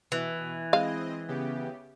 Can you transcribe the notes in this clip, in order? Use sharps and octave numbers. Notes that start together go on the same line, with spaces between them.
B2 E3
G#3 C4 D#5 F5
C#3 B3 G4